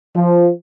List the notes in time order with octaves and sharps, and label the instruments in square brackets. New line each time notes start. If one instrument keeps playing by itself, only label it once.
[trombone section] F3